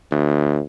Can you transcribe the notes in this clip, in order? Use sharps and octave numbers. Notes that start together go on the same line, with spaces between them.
D2